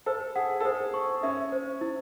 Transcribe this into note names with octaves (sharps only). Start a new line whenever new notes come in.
A4 C5
G#4 F#5
A4
G#4 C5
C#6
C#4 E5
C5
E4